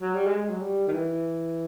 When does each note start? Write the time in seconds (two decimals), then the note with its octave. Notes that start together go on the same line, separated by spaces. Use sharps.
0.01 F#3
0.14 G3
0.27 G#3
0.50 F#3
0.60 G3
0.87 D#3
0.93 E3